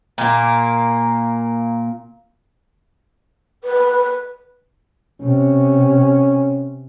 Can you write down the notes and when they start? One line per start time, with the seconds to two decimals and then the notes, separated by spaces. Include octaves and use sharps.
0.18 A#2 A#3
3.64 B4
5.21 C3 C#4